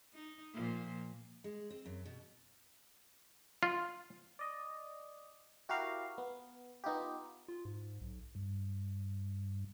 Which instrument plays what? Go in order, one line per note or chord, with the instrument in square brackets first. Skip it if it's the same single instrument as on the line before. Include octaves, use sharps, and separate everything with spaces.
[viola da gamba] D#4
A#2 F3
[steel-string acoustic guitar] G#3
C4
F#2
B2
[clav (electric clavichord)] F4
[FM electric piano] D5 D#5
E4 F#4 G4 A#4 F5
B3
B3 D#4 F4 G4
[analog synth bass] F4
G#2
B1
[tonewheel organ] G2